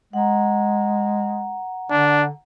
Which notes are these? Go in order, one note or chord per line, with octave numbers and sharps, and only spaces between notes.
G#3 F#5 A#5
D3 D4